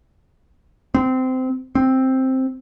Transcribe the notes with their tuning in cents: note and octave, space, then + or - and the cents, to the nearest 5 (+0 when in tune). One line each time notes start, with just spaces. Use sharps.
C4 -20
C4 +5